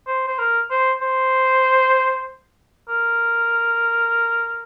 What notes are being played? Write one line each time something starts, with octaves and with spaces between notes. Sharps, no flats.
C5
C5
A#4
C5
C5
A#4